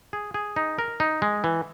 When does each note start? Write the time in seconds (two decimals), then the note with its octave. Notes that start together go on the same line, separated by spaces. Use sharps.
0.13 G#4
0.34 G#4
0.56 D#4
0.78 A#4
1.00 D#4
1.22 G#3
1.44 E3